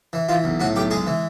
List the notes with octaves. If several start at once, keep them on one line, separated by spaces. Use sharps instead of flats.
E3
E3 F4
B1
A2 F#4
B1 G4
G#3 G#4
E3